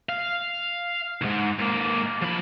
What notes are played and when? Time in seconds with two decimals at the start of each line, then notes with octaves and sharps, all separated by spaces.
0.09 F5
1.22 D#2 G#2
1.59 G#2 A#3
2.22 F3 B5